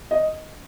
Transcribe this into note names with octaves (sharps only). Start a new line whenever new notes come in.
D#5